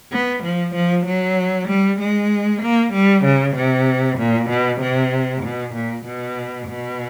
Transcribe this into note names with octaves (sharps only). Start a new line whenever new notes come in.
B3
F3
F3
F#3
G3
G#3
A#3
G3
C#3
C3
A#2
B2
C3
B2
A#2
B2
B2